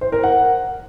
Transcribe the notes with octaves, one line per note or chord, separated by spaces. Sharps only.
C5
A#4
F#5